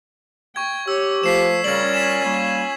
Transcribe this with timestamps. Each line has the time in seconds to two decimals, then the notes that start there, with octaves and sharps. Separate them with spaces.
0.56 G5 C#6 G#6
0.88 G4 C#5 E6
1.23 F3 A3 B6 C7 E7
1.64 C#3 G3 C#4 F4 A#4 D5 G#6 F#7
1.94 G#5 B6 E7
2.25 G3 A#3